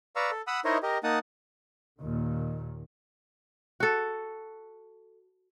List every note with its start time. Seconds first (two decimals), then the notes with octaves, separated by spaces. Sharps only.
0.16 B4 D5 F5 A#5 C#6 E6
0.31 A4
0.47 F#5 B5 D#6 E6
0.65 D#4 E4 A#4 C5 C#5 D#5
0.83 G4 A#4 D#5
1.04 A#3 D#4 F#5 A5 D#6
2.01 D#2 A#2 D#3
3.80 F#4 A4